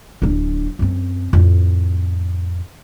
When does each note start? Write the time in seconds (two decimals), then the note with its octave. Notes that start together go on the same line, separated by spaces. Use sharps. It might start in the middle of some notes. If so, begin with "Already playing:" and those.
0.22 D1 D4
0.79 F#2 C4
1.33 F2 A2